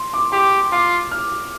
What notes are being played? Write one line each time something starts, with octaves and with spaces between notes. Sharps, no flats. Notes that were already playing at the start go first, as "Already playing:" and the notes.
Already playing: C6
D6
G4 C6
F4 D6
F6